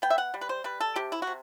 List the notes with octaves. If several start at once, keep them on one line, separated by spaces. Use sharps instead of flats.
B3 G5
E5
F#5
G3
B4
C5
G3 B4
A4
C3 G4
E4
F#4
C3